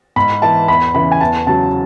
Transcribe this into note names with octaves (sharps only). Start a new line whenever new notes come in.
G#2 B5
E3 A5
E2 B5
C#3 E3 B5
G#5
E2 A5
C#3 F#3 A5